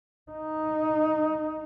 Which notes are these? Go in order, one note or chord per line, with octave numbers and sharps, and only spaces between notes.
D#4